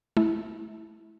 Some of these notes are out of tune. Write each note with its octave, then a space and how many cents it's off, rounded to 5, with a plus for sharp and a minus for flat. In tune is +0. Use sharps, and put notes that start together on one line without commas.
A3 -30 E4 -5